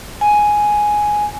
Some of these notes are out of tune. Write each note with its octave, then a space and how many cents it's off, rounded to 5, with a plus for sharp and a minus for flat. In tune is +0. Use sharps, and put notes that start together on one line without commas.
G#5 +5